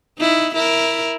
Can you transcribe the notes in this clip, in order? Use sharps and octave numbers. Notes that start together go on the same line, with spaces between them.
D#4 E4
E4 A#4